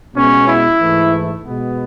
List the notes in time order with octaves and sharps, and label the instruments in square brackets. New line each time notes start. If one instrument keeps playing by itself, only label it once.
[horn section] B2 G#3 B3 C#4
E4
G#2 E3 A3
B2 G#3 B3